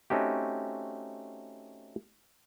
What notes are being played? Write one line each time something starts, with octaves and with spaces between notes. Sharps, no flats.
A3 C4 C#4 D#4 F#4 G4